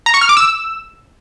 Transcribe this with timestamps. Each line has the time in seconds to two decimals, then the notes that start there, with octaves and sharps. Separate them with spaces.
0.06 A#5
0.14 C#6
0.21 F6
0.29 D6
0.37 E6